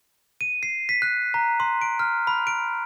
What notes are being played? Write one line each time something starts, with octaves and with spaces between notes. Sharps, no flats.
D#7
C7
B6
F#6
A#5
C6
D7
F6
B5
D7